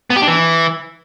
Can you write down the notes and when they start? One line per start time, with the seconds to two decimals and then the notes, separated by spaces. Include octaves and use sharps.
0.10 B3
0.16 G4
0.22 D4
0.28 E3